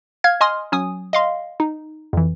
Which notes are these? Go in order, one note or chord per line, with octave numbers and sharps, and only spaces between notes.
F5 F6 G#6
D#5 G#5 C6 D#6 F6
F#3 C#4 G#5 D#6
D#5 F5 C6
D#4
F2 E3